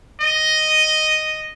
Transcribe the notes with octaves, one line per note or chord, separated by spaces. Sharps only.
D#5